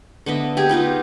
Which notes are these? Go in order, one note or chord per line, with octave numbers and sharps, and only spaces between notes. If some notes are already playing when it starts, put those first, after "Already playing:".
D3 B3 D#5 E5
G4 G#4
B3 D#4 F4 G4